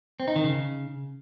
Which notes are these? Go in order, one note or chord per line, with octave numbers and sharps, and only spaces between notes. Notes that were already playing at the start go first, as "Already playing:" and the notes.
C4
D#4
D#3
C#3